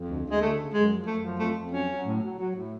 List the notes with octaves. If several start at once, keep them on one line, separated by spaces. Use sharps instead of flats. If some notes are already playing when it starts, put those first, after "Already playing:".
Already playing: F2
D2
D2
G#3
D2 A3
C#3
F#2 G#3
F3
F#2 A3
F3
F2 A3
F2
F#3 C#4
F#3
A2
F#3
F#3
A2